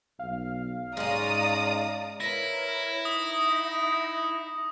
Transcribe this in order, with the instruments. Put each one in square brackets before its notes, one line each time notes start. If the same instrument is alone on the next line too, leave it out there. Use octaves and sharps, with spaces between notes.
[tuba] B1 [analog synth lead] F5
[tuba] G#2 [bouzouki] G#3 C#4 [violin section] D5 A#5 D#6
[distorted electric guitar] E4 [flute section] A#4 B4 C#5 [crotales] A#6
[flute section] D#4 E5 F#5 [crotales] D#6